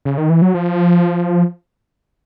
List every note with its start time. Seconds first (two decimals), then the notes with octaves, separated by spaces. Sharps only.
0.05 C#3
0.18 D#3
0.30 E3
0.42 F#3
0.54 F3